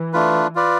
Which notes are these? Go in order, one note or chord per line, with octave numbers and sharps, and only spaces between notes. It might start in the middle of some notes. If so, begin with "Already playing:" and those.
Already playing: E3
A3 D4 F4 B4
F4 B4 D5